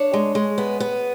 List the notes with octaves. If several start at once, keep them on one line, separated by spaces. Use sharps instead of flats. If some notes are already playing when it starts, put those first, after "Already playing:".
Already playing: D4 C#5
G#3
G#3
B3
B3